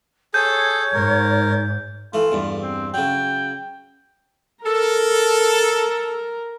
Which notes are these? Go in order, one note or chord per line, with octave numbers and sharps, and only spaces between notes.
G#4 A4 C#5 G6
G#2 A#4
E3 A3 F4
E2 G2
C4
C#3 F#3 G5
A4 A#4 A#5